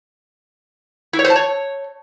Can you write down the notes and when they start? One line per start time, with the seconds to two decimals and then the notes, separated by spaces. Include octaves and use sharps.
1.13 E4
1.19 C#5
1.25 C5
1.30 A5
1.36 C#5